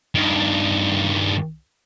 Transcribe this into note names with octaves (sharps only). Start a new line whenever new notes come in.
G2 D#3